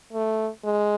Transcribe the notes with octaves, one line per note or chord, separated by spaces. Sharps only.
A3
G#3